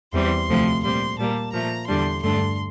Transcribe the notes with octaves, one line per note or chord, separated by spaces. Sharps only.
E2 E3 G3 C4 C6
D2 C3 F3 A3 C4
A#2 G3 C4 C6
A#2 G3 A#3 A5
A#2 F3 A3 A#5
E2 D3 G3 D4 C6
G2 D3 A3 D4 C6